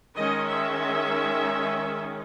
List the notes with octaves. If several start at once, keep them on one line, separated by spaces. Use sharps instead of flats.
D#3 G#3 C#4 D#5
E5